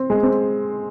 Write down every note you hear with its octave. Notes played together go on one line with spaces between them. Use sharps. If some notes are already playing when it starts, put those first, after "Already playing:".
Already playing: C4
G#3
C4